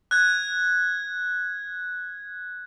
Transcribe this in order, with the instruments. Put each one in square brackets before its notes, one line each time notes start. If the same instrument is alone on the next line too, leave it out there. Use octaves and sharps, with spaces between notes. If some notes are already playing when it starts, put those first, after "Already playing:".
[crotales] F#6 G#6